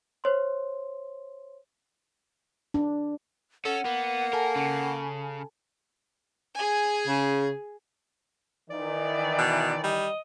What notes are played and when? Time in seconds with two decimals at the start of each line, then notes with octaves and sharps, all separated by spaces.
0.24 C5 C#5 C6
2.74 D4
3.65 C#4 A4 F#5
3.85 A#3 B3
4.33 A4 A#4 G#5 A5
4.56 C#3
6.55 G#4 G#5
7.08 C#3
8.71 D#3 E3 D5
9.38 B2
9.83 G3 D#5